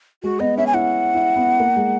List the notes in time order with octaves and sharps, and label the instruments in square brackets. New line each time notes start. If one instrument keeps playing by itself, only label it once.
[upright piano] G#3 [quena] F#4
[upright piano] B3 [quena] D#5
[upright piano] C#4 [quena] E5
[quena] G#5
[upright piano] E4 [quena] F#5
[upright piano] E4
B3
A#3
G#3